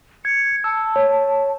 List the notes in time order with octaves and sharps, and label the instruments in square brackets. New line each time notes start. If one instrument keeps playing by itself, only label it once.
[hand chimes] G#6 [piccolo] C#7
[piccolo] A5 [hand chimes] E6
[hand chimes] C#5